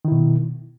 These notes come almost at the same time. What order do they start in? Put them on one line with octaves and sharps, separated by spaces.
D#3 E4 B2